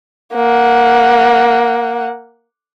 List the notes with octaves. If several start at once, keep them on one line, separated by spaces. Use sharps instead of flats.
A#3 F#5